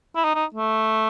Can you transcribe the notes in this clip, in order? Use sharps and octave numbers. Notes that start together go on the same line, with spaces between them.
E4
D#4
D#4
A3